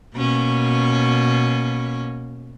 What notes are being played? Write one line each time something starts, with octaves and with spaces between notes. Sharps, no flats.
B2 A#3 C#4